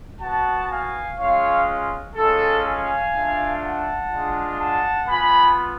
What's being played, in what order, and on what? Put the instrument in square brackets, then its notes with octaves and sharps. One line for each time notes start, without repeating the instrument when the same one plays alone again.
[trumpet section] B3 F#4 F#5 A5
F5 G#5
G#3 C#4 F4 C#5 F5
G#3 C#4 F4 A4
F5 G#5
A3 D4 F4
F#5 A5
G#3 D4 F4
F#5 A5
B3 F4 G#5 B5